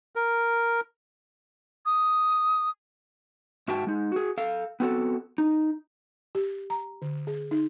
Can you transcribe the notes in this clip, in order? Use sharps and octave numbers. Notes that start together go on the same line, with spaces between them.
A#4
D#6
G#2 F#4 E5 G5 A5
G#3 D#4
F#4 G#4
A4 F5
B3 C4 F#4 A4
D#4
G4
A#5
D3
G#4
D#4